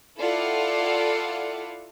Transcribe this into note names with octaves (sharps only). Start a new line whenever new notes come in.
E4 F4 A4 D5 F5 F#5